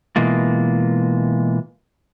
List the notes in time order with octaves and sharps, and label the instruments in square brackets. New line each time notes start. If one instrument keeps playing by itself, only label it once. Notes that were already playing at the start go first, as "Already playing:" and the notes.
[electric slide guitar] B2 E3 G#3 A#3 F4